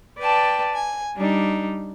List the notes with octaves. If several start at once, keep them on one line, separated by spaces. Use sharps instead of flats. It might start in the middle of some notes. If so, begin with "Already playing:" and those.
B4 D5 G5 A5
G#5
G3 D4 D#4